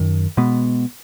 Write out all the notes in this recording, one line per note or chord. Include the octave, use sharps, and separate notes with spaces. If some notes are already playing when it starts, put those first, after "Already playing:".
Already playing: F#2 D#3
B2 G#3 B3